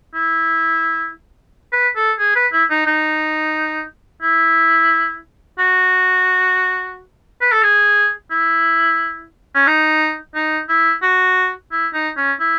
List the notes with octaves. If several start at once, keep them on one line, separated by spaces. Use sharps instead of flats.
E4
B4
A4
G#4
B4
E4
D#4
D#4
E4
F#4
B4
A4
G#4
E4
C#4
D#4
D#4
E4
F#4
E4
D#4
C#4
E4